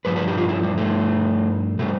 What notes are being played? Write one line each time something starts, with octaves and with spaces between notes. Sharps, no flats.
G2 F3 B4
B4
G4
F4
E4
G3
A3
B2 G3 A3